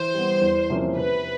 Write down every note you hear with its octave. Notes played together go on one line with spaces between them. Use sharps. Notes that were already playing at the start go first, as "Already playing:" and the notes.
Already playing: E3 C5
G3 B3
E2
C3 F3 A#3 C#4
C3 B4